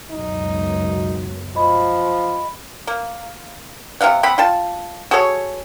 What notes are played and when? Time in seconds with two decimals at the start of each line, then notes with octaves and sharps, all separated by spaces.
0.11 C#2 F#2 B2 D#4
1.56 F3 D#5 B5
2.87 A#3
4.01 C3 D#4 F5 F#5
4.23 C4 F#5 B5
4.38 F4 G5 A5
5.11 F#4 G#4 A4 C#5